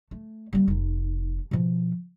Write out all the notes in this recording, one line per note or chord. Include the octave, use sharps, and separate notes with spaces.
A3
G3 A#3
F1 D#4
B2 F3